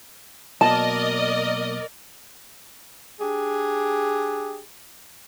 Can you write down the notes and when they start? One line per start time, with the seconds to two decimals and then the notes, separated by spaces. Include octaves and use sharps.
0.61 B2 F#3 A#3 A#4 D5 D#5 A5
3.20 D4 G4 G#4